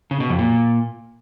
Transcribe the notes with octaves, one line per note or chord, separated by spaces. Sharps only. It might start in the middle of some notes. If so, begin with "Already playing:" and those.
C#3
B2
F2
A#2